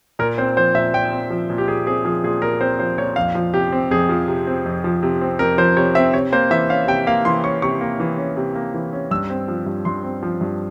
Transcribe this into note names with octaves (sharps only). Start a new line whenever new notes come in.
A#2 A#4
C4 C5
F3 C5
A#2 E5
A#2 G5
C4
F3
A#2
G4
A#2 G#4
C4 G#4
F3 G#4
A#2 G#4
A#2 A#4
C4 C5
F3 C5
A#2 C#5
F2 F5
F3
C3 G4
C4
F2 G#4
F3
C3
C4
F2
F3
C3
C4
F2 A#4
F3 C5
C3 C#5
C4 E5
C3 C#5
A#3 C5
E3 E5
C#4 F5
C3 G5
A#3 F5
E3 C6
C#4 C#6
C3 C#6
A#3
E3
C#4
C3
A#3
E3
C#4
G2 E6
C4
F3
G2
G2 C6
C4
F3
G2